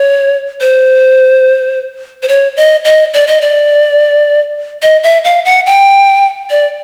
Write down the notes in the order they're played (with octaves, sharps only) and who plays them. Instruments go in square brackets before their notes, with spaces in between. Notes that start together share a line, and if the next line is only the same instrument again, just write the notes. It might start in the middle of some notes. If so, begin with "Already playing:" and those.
Already playing: [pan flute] C#5
C5
C5
C#5
D#5
D#5
D5
D#5
D5
D#5
E5
F5
F#5
G5
D5